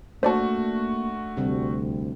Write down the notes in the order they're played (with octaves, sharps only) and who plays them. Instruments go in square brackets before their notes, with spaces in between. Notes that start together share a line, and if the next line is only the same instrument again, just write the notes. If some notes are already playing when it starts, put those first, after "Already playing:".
[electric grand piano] A3 F#4 [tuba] A#3 [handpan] D4 [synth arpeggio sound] C5 D5 A5
[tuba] D2 [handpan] C3 G3 C4